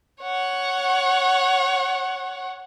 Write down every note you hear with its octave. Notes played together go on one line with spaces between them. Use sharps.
C#5 F#5